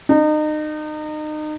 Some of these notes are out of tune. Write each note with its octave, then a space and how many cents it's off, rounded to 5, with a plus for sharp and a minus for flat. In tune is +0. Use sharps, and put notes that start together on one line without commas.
D#4 -30